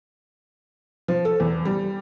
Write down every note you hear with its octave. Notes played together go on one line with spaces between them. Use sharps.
F3
A4
E2
G3